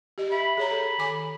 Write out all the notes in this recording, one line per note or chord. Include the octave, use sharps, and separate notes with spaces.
G4 D#5
E5 B5
G#4 C#5 A#5
A4
D#3 G#5 D6